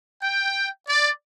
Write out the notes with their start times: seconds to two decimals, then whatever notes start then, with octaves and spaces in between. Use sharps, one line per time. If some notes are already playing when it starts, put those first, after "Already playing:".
0.23 G5
0.87 D5